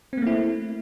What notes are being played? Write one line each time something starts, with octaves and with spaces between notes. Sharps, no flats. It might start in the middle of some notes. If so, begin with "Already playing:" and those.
A3 A#3 C4 E4